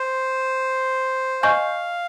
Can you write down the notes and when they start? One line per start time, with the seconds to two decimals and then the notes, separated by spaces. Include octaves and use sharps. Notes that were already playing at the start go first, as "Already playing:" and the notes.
Already playing: C5
1.42 D#5 F5 G#5 C#6 G6